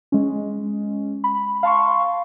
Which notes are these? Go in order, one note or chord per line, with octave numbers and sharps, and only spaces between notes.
G#3 C#4
B5
F5 A5 C6 C#6